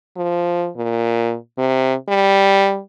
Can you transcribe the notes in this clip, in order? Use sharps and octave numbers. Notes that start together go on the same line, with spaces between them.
F3
A#2
C3
G3